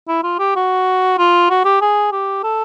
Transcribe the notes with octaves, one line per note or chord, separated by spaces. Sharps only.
E4
F4
G4
F#4
F4
F#4
G4
G#4
G4
A4